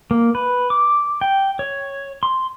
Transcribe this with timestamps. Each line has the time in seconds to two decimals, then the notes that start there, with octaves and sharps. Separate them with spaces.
0.11 A#3
0.35 B4
0.70 D6
1.21 G5
1.59 C#5
2.23 C6